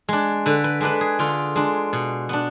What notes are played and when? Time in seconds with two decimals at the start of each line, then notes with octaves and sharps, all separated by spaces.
0.09 G#3 D4
0.46 D3 B4
0.64 B4
0.81 G#3 D4 B4
1.01 G#4
1.19 D3 F4
1.56 G#3 D4
1.93 B2
2.29 B3 D4